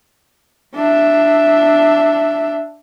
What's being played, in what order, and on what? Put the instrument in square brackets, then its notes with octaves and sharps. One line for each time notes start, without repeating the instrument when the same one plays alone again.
[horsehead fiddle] D4 E5